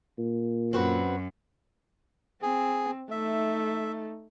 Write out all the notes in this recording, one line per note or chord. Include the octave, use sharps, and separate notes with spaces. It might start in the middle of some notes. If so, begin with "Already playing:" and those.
A#2
F#2 C4 F#4 B4
C4 G#4
A3 D#4 E5